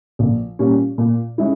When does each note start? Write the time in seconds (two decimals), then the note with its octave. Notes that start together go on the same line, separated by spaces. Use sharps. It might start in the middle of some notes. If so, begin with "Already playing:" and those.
0.19 A#1
0.59 A#2 G3 C#4
0.98 A#2
1.38 G#3 C#4 E4